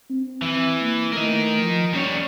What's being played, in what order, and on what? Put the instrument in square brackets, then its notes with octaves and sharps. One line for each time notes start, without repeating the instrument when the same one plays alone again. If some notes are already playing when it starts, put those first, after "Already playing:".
[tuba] C4
[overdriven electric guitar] E3
[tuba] A#3
[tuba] A3 [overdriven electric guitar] A#4 D#5
[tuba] F3
[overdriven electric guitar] G3 C#5 [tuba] C#4